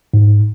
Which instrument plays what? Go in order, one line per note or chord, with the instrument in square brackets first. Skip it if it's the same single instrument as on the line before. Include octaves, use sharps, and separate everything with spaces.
[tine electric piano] G#2